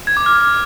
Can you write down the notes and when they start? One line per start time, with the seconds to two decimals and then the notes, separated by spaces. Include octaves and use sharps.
0.07 G#6
0.17 D6
0.26 F6